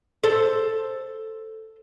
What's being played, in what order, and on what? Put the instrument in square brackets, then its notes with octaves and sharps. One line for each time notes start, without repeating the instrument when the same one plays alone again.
[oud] A4 C5